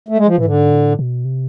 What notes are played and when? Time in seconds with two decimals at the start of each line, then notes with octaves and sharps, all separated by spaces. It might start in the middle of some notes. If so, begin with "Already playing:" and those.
0.08 A3
0.18 G#3
0.27 F3
0.36 A2 E3
0.45 G#2 D3
0.72 A2
0.99 B2
1.25 C3